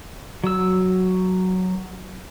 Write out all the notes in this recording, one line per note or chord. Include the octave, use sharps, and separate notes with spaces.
F#3 E6